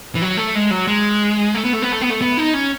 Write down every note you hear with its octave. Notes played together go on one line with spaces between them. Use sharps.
E3
F#3
A3
G#3
F#3
G#3
A3
B3
A3
B3
A3
B3
A3
B3
D#4
C#4